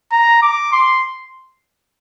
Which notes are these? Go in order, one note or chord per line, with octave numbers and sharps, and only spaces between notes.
A#5
D6
C6